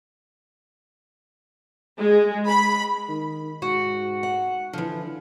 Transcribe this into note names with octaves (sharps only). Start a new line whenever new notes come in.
G#3
B5
D#3
G#2 F#4
F#5
D3 E3 F3